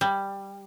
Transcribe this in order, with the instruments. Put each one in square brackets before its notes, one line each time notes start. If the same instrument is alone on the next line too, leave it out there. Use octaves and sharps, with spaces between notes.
[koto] G3